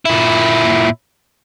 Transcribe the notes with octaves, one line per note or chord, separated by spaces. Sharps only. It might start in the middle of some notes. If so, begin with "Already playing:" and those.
A#2 E4